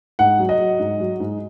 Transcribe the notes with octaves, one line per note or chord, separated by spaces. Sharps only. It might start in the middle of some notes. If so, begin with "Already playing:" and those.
G#2 F#5
F#3
D#5
F#3
G#2
F#3
G#2